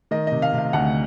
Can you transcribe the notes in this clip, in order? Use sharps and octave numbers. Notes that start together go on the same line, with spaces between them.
D#3 D#5
C3 D#5
F5
C3
F5
D2 F#5